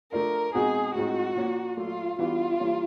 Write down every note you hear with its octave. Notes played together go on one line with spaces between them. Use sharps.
F3 A3 D4 F4 A#4
B2 G#3 C4 D#4 F#4 G#4
A2 F3 G#3 C4 D#4 F#4
A#2 F3 A#3 C#4
A#2 F#3 A3 F4
E3 G3 B3 D4 F4 F#4
E3 G3 A#3 C#4